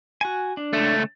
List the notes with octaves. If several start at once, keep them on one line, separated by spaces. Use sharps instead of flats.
F#4 G#5
D4
C#2 A3